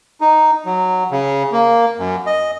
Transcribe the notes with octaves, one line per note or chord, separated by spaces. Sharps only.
D#4
F#3
C#3
A#3
F#2
D#5